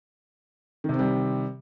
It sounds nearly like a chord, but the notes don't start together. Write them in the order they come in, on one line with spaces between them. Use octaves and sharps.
D#3 C3 C4 G3